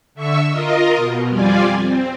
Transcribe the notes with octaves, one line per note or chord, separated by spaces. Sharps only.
D3 E5 C#6 E6
F4 A#4 D#5
B2
F2 G3 F4 D5 G#5
C4